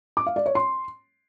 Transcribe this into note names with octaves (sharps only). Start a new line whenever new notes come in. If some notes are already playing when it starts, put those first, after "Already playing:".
D6
F5
D5
C#5
C6